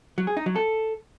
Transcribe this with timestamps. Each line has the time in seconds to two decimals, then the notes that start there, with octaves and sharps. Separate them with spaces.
0.18 F#3
0.27 G#4
0.37 D#4
0.46 F#3
0.56 A4